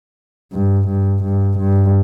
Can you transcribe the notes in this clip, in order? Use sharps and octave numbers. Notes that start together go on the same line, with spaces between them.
G2
G2
G2
G2